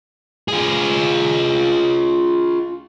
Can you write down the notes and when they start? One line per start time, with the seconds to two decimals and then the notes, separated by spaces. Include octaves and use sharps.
0.48 F4 G#4